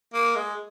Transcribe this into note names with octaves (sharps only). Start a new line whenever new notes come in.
A#3
G#3